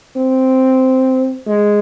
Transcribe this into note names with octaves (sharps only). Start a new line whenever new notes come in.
C4
G#3